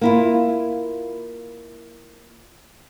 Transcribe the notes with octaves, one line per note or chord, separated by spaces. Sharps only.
A#3 E4 F4